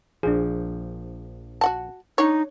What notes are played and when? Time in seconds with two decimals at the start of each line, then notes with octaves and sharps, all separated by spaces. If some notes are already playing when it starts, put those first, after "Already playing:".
0.23 A#1 F3 D4 G#4
1.61 F#4 F#5 A5
2.18 D4 D#4 C#5